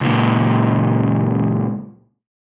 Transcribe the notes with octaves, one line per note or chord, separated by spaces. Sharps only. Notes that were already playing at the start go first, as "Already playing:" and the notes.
C#2 A#2